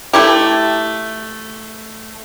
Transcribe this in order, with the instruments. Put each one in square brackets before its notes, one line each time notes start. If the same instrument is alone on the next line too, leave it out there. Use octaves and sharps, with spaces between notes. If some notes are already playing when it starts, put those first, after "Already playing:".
[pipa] A3 E4 G4